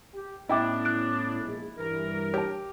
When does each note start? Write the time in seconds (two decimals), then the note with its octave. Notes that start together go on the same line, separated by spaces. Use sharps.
0.13 G4
0.49 A2 B3 C#4 D4 E4 D#5 G5 D6
0.85 F#6 D7
1.42 A#1 G#3
1.78 G2 E3 A#4
2.34 G4 C#5 A5